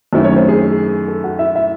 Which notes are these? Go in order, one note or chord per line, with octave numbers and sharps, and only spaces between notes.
F#2 D#3 A3 C4 E4
C#4 C#5
C4 C5
G#4
A4
F#4 F#5
E4 E5
E4 E5